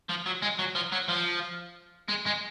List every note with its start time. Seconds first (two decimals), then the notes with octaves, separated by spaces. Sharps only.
0.09 F3
0.26 F#3
0.42 G#3
0.59 F#3
0.75 F3
0.92 F#3
1.09 F3
2.09 G#3
2.26 G#3